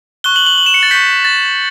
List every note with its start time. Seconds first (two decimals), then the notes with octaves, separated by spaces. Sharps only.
0.24 C#6 F#6 G7
0.36 F#7
0.46 F#7
0.58 F#7
0.66 E7
0.74 C#7
0.83 A6
0.91 C#6 G6 B6
1.25 A6